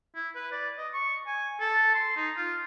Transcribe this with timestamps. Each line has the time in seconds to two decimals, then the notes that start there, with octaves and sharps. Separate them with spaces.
0.15 E4
0.35 B4
0.52 D5
0.78 D#5
0.93 C#6
1.27 G#5
1.60 A4
1.94 C6
2.16 D#4
2.37 F4